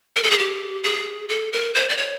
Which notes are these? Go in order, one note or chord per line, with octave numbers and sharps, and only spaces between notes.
A#4
A4
G#4
G4
G#4
A4
A#4
C5
D5
C#5